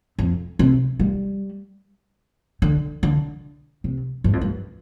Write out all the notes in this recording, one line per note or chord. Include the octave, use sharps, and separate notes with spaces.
F2
C3
G3
D3
D3
C3
G2
F2
G2